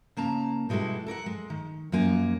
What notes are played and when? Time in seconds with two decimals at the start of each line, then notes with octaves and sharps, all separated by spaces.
0.17 C#3 A#3 A5 A#5
0.69 B2 G3 G#3 E4 F#4 A4
1.06 A4 A#4 D5 F#5
1.26 G#3
1.50 D#3
1.92 F#2 F3 A#3 G#5